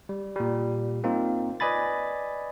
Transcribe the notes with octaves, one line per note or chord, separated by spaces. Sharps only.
G3
A#2 G3
A#3 C4 D#4 F4
B4 D5 D#5 G#5 B5 A6